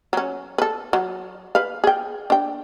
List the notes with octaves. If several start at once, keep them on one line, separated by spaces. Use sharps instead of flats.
F#3 C#4
A4 B4
F#3
B4 F5
G#4 G5
D4 G5